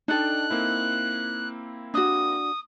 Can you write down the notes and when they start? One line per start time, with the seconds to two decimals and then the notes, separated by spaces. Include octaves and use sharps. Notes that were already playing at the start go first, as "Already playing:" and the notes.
0.08 D4 D#4 A4 D5 G5 F#6
0.50 A#3 C4 E4
1.94 D4 F#4 D#6